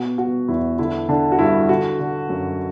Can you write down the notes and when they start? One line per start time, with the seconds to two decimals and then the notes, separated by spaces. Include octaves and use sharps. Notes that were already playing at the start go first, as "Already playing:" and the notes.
Already playing: B2 F#4
0.18 B2 F#4
0.48 E2 E4
0.79 D3 E4
1.09 D3 D4
1.32 F#4
1.39 G2 E4
1.69 D3 F#4
1.99 D3
2.29 F#2